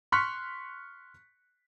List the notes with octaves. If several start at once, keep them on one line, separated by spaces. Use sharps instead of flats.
C6 C#6 F6 F#6 B6 C#7